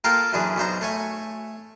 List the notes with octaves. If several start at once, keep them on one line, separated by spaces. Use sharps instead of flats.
A#3 F4 A4 A#4 F5 G5
F#2 E3 D4 G#4
B1 B3 C5 A#5
A3 C#5 G#5